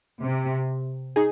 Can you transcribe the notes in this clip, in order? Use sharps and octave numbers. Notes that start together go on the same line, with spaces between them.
C3
D#4 G#4